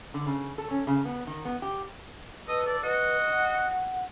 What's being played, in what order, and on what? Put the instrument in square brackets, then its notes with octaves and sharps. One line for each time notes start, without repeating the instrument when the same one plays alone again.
[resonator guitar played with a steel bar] D3
C#3
A4
C#4
C#3
B3
D#3
B3
G4
[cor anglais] A4 [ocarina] B4 [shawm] D#5
[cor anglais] A4 [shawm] D5
[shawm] F#4 [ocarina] B4 [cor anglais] D#5
[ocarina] F#5